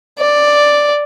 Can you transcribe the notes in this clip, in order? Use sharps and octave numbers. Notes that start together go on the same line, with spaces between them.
D5